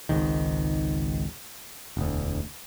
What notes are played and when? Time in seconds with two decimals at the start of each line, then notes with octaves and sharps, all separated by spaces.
0.09 G#1 C#2 G#2 D#3
1.97 E1 D2